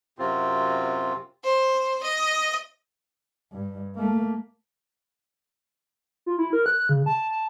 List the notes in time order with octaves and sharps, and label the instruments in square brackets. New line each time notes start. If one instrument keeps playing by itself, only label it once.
[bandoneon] F#2 C3 C4 F4
[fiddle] C5
D#5
[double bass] G2
A3 A#3
[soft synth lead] F4
E4
A#4
F#6
C#3
A5
A5